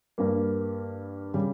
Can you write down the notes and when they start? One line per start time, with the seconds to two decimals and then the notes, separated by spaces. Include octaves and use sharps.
0.18 G2 G3 A#3
1.34 C#3 G3